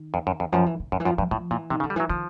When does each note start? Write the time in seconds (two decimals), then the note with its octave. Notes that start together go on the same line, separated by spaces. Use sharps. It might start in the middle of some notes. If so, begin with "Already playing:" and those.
Already playing: D#3
0.14 F2
0.27 F#2
0.40 F2
0.52 F#2 F3
0.66 E3
0.80 D3
0.92 F#2 D#3
1.00 E3
1.05 F#2 F3
1.18 G2 F3
1.31 A2 F3
1.51 A#2 E3
1.70 C3 D#3
1.80 C#3
1.83 D3
1.90 G3
1.96 E3 F#3
2.10 D#3 F3